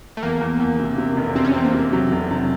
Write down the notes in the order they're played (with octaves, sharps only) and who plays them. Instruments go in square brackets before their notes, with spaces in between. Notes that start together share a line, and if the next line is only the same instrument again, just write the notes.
[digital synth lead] A3
[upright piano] E2 [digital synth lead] A#3
[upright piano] E2
E2
C3
C3
F1
[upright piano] C3 [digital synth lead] C4
[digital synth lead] C#4
[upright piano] E2 [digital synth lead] C4
[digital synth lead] A#3
[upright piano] C3
[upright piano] C3 [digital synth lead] F#3
[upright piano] F1
C3